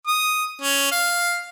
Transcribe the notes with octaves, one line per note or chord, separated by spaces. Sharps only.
D#6
C#4
F5